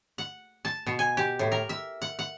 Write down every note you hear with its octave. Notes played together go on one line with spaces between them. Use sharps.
F#5
A5
B2
G#5
G4
A2
A#4
E5
F#5
F#5